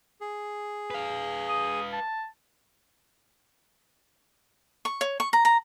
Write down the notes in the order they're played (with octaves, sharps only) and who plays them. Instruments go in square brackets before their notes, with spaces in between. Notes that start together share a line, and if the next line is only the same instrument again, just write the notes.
[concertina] G#4
[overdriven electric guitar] B4 F5
[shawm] D#6
A5
[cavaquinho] C#6
C#5
C#6
A#5
A#5